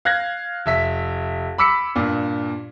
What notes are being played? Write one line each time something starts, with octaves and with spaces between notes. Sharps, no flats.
F5 F#6 G#6 A#6
F1 E5 B6
B5 D6 E6 B6 C#7
G2 A#2